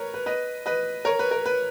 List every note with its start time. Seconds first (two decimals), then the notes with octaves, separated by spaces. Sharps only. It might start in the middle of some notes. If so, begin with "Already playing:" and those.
Already playing: A#4 B4 C#5
0.14 B4
0.26 B4 D#5
0.66 B4 D#5
1.05 A#4 C#5
1.19 B4
1.31 A#4
1.46 B4